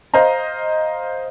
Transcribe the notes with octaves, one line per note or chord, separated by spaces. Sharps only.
C5 D#5 F5 A#5